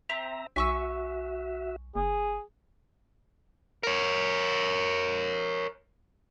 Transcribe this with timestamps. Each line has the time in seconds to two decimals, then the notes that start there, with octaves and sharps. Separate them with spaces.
0.09 C4 E5 A#5
0.56 B1 F#4 E5 G#5 C#6 E6
1.95 F#1 G#4
3.83 A#4 C#5